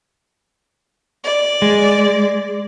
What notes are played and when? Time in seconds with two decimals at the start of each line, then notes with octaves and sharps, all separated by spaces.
1.24 D5
1.62 G#3